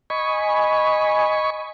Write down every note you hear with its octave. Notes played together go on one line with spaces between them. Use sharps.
D#5 G#5 B5 C#6